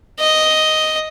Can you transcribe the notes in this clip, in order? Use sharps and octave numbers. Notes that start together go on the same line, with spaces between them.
D#5